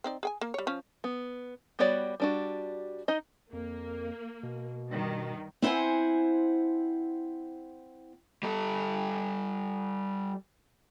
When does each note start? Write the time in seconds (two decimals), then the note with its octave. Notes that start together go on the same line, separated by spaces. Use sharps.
0.04 C4 D#4 D5
0.23 G#4 G5 G#5
0.41 A#3
0.54 G3 C#5
0.67 F3 C#4
1.04 B3
1.79 G3 B3 F#4 C#5 D5
2.20 G3 D4 F#4
3.08 D#4 D#5
3.53 F2 A#3
4.43 B2
4.90 G2 D#3
5.62 C4 E4 C5 F#5 G#5
8.43 G3 A4